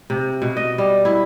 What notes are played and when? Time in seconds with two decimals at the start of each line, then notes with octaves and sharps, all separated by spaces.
0.10 C3
0.42 B2
0.57 D#5
0.78 G3
1.05 E4